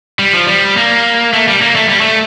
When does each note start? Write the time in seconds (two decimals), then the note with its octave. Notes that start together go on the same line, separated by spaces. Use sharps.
0.19 G3
0.33 F3
0.47 G3
0.77 A#3
1.33 A3
1.48 G3
1.62 A#3
1.76 A3
1.89 G3
2.01 A3